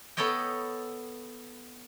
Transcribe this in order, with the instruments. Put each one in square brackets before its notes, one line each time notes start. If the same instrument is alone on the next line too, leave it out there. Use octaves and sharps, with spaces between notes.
[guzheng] B3 A4 C#5 D#5 G5